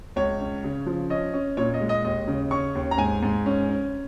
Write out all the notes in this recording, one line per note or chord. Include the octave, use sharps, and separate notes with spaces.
C#2 C#5
C#4
C#3
F3
C#4 D#5
C#4
A#2 C#5
D#5
G#3
D#5
D#2 D#5
C#3
C#4 C#6
D#2
A#5
G#2 G#5
G#2
C#4
C#4